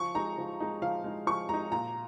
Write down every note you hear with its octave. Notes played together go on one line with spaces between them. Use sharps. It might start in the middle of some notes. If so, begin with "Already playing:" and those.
Already playing: F3 C#6
G#3 D#4 A#5
F3
G#3 D#4
F3 F5
G#3 D#4
F3 C#6
G#3 D#4 A#5
A#2 A#5